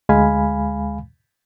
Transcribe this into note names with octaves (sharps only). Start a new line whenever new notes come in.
D2 G#3 F5 G#5 B5